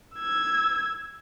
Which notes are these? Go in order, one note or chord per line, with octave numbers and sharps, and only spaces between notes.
E6 G#6